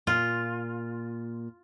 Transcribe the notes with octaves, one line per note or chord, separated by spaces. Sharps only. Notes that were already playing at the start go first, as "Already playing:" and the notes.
A#2 F4